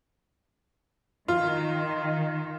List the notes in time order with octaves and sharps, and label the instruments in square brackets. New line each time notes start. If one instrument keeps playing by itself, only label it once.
[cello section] D#3 [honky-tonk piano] F4